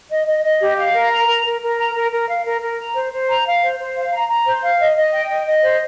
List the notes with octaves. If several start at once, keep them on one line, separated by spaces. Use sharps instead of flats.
D#5
D#5
D#5
G4
F5
A#4
A#5
A#4
A#4
A#4
A#5
A#4
A#4
F5
A#4
A#4
A#5
C5
C5
A#5
F5
C5
C5
F5
A#5
A#5
C5
F5
D#5
D#5
G5
D#5
D#5
C5